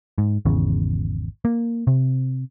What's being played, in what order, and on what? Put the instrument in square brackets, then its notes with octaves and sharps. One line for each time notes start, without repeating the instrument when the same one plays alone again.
[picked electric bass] G#2
G#1 E2 C#3
A#3
C3